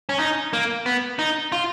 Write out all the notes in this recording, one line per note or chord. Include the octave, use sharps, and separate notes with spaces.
C#4
D#4
A#3
B3
D#4
F4